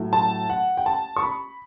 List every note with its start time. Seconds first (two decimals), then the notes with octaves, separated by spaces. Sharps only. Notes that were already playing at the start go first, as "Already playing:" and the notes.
Already playing: A2 F#3 A3
0.13 A5
0.49 F#5
0.77 G5
0.86 A5
1.16 C#6
1.23 B5